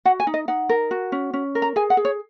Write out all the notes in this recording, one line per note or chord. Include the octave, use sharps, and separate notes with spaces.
F#4 F#5
G#5
D#4
D#5
D#4 F#5
A#4
F#4
C#4
C#4
A#4
A#5
G#4 G#5
F#5
G#4
C#5